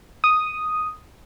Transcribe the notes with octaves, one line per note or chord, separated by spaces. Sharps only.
D#6